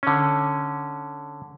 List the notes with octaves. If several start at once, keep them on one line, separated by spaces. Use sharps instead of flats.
D3 C#4